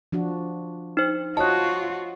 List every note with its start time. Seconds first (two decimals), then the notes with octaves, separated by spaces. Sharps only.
0.12 F3 D4 F#4
0.97 D#4 C5
1.37 F4 F#4 C5 C#5 D#5 A5 F#6